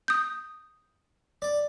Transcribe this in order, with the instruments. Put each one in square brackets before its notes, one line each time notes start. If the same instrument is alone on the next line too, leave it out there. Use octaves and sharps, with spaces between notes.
[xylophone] D#6 G6
[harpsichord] D5